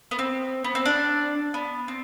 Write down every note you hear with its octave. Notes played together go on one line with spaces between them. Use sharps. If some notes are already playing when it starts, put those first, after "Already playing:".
B3
C4
B3
C4
D4
B3
C4